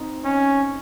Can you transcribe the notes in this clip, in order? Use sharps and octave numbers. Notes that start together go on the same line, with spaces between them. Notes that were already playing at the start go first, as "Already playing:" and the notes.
Already playing: C4 D#4
C#4